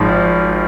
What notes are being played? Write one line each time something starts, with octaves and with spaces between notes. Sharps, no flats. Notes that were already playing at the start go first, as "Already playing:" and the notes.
Already playing: G#1 G#2 F3